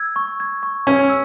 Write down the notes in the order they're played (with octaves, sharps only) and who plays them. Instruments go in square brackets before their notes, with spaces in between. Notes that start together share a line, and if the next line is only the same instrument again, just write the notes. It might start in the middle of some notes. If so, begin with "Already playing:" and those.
Already playing: [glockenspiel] E6 G#6
C#6
G#6
C#6
[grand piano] C#4 [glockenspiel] G#6
[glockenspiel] E6